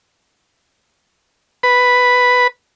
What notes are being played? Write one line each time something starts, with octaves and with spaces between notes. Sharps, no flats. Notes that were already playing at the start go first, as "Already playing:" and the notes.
B4 B5